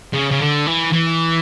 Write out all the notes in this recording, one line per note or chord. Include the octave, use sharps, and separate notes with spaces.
C#3
C#3
D3
E3
E3